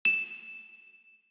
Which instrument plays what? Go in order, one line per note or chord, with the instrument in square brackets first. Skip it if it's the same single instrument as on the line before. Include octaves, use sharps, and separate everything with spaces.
[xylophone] E7